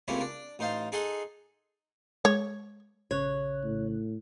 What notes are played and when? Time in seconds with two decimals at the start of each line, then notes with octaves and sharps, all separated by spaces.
0.08 C#2 C3 A3 A#3 C#4 E4
0.21 D4
0.59 A1 D#4 C5 F5 A5
0.92 D#4 G#4 A4 D#5 F#5 C6
2.25 G#3 C#5
3.11 A#1 C#3 C#5 F#6
3.64 A2